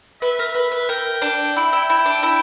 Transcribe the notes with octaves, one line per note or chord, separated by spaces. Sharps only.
B4 E5
A#4
B4
B4
A#4 G5
D4
E4 G5
E4
E4
D4
E4